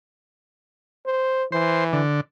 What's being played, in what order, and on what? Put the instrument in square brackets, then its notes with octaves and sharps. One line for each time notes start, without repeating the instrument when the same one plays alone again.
[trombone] C5
[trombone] E3 [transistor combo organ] C5
[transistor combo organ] D3